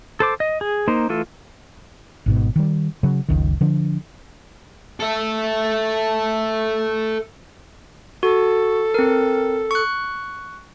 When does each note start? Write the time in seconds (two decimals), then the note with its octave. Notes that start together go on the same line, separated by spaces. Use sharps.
0.20 A4 C5 D6
0.40 D#5
0.61 G#4
0.88 A#3 D#4 C5
1.09 E3 A3 F4 A4
2.26 G#1 G#2 B2
2.56 D#3 G3
3.03 C#3 F#3
3.29 F#1 C#2 D#3
3.61 D3 F3 D4
5.00 A4 E5
8.23 F#4 A4
8.94 C4 A#4
9.71 C#6 F#6